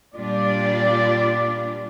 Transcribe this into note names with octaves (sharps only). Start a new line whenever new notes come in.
A#2 G3 D4 F4 D5